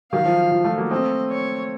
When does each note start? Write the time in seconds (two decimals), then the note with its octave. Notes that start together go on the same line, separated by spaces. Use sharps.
0.12 D#3 F#3 F5
0.25 F3
0.51 F3
0.64 F3 A3
0.78 F#3 A#3
0.91 A3 C4 D#5
1.30 C#5